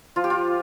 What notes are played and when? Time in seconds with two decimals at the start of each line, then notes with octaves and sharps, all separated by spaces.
0.16 F3 F4
0.24 G4
0.30 F4